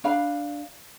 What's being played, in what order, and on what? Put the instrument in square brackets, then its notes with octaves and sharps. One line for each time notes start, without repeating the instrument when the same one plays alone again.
[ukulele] D4 F5 B5